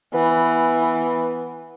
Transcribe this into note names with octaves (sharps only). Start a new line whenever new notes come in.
E3 B3